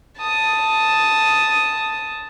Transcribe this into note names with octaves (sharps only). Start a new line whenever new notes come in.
A5 D#6